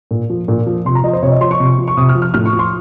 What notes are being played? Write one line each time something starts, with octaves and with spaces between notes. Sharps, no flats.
A#2
F3
A#2
F3
C3 C6
A#5
F3 D#5
C5
C3 C#5
D#5
F3 C6
C#6
C3
F3
C#6
C3 D#6
F6
F3
F6
A2 F6
C#6
F3
C6